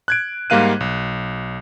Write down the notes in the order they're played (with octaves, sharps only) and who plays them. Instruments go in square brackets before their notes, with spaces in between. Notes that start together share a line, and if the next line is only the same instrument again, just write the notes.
[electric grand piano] F#6 G#6 D7
G#2 G3 A#3 F5 F#6 D#7
B1